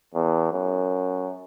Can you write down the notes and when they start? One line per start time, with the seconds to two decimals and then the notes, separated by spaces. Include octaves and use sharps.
0.15 E2
0.53 F#2